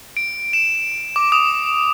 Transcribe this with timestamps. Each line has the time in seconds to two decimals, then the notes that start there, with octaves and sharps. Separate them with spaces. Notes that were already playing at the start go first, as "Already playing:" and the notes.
0.17 D7
0.53 E7
1.16 D6
1.32 D#6